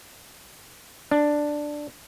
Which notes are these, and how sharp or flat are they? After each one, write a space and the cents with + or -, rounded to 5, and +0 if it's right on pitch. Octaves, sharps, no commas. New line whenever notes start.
D4 +5